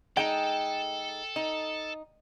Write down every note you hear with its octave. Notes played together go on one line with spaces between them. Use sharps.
G#3 D#4 A4 G5 A5
D#4